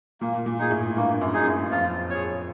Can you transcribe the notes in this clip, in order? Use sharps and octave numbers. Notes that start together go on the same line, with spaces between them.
A#2 A#3
A#2
D#4 G#4
A2
G2 A#3
F#2
D#4 G#4
F#2
F2 F4
G#4 C#5